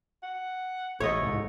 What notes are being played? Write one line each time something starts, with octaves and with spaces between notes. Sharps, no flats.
F#5
A1 A3 C#5 D#5
C2 G#2